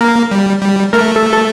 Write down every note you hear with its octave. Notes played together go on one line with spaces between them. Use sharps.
A#3 A#4
G3
G3
A3 A#4
A4
A4